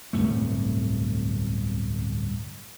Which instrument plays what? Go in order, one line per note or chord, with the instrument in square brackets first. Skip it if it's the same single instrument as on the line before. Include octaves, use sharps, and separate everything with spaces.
[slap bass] D1 G1 C2 A3